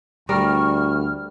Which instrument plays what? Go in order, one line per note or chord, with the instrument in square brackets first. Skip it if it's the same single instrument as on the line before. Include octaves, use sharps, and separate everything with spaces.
[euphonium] D2 [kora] G3 A#4 [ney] C#6 [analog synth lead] F6